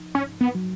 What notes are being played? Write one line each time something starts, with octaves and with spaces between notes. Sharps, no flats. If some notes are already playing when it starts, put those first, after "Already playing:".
Already playing: F3 D#4
G#2 C#4
B3
F#3